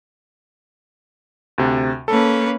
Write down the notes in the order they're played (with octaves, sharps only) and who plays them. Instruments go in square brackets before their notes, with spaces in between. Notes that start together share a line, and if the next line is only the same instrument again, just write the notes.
[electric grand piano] D2 C3
[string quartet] A#3 C#4 B4 [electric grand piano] A4